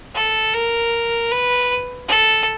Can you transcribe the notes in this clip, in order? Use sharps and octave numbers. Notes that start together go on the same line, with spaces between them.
A4
A#4
B4
A4